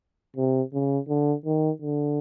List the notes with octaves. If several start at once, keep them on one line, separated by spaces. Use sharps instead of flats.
C3
C#3
D3
D#3
D3